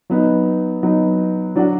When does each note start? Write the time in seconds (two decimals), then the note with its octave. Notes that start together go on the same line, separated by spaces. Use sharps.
0.10 F#3 B3 D#4
0.83 F#3 B3 D#4
1.56 F#3 D4 F#4